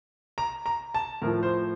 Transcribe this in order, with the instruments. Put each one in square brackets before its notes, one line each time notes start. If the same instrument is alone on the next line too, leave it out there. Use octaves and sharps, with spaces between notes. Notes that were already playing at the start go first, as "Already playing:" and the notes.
[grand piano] A#5
A#5
A5
A2 F3 A#4
C5